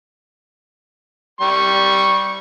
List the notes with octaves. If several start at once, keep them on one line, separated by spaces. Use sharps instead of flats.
G3 C#6